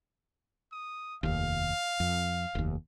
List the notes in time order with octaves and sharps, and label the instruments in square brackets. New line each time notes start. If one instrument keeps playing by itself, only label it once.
[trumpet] D#6
[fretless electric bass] F1 D#2 [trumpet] F5
[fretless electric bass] F2
F1 D#2